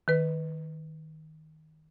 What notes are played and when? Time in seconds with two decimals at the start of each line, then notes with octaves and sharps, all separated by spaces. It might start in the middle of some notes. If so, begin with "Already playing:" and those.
0.08 D#3 B4